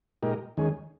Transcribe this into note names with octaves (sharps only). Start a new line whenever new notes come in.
A#2 G#3 D#4 G4 A#4
D#2 D#3 G#3 C#4 G#4